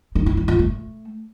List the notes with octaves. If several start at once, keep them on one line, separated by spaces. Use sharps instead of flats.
D#4
E4
E4
F4
A3